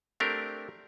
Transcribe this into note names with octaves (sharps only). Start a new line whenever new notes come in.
A3 C4 D4 G4 A#4